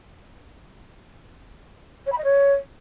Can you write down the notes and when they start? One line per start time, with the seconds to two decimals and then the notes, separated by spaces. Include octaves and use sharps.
2.06 C#5
2.12 B5
2.18 D#5
2.24 C#5